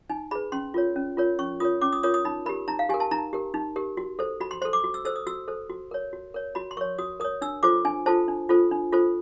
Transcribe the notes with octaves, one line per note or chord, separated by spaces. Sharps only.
D#4 G#5
G#4 B4 B5
C#4 C6
F4 A#4 C#5
C#4
F4 A#4 C#5
C#4 C#6
F4 A#4 C#5 D#6
C#4 D6
D#6
F4 A#4 C#5 D#6
D#6
D#4 B5
G4 A#4 B5
D#4 A#5
F5
G4 A#4 G#5
A5
D#4 A#5
G4 A#4
D#4
G4 A#4
F#4
A4 C5
F#4 B5
C6
A4 C5 C6
D6
F#4
E6
A4 C5 E6
D#6
F#4 E6
A4 C5
F#4
A#4 C#5
F#4
A#4 C#5
F#4 B5
C6
A#4 C#5 C#6
F#4 D#6
A#4 C#5 D#6
D4 E6
F4 A4 C5 D6
D4 G#5
F4 A4 C5 A5
D4
F4 A4 C5
D4
F4 A4 C5